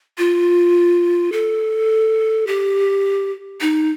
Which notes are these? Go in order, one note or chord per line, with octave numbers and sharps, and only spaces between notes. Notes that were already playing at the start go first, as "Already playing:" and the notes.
F4
A4
G4
D#4